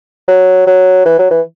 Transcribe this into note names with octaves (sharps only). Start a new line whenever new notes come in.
F#3
F#3
E3
F#3
E3